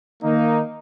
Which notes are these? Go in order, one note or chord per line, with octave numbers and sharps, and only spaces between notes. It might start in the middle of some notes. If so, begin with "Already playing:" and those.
D#3 A#3 D#4